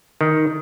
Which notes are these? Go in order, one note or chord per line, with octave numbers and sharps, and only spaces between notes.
D#3